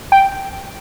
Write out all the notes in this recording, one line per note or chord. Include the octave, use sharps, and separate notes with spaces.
G5